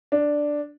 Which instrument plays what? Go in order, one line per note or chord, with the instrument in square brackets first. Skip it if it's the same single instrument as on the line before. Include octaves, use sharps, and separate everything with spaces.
[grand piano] D4